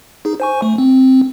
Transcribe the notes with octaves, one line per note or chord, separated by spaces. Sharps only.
D#4 G#4
C5 G#5 C#6
A3
C4